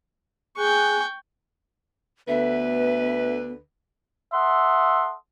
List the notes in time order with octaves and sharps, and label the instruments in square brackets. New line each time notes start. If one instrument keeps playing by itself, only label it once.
[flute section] G#4 G#5 F#6 [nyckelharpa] G5 C#6
[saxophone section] D2 D3 B4 [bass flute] B3 [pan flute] E5
[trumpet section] A4 E5 F#5 C6 D#6